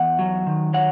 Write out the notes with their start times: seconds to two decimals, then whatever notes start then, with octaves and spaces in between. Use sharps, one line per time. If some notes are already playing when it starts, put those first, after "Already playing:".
Already playing: E2 F#5
0.19 F#3
0.47 D#3
0.73 F#3 F#5